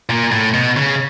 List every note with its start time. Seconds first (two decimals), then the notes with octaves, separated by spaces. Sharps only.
0.10 A#2
0.32 A2
0.54 B2
0.77 C#3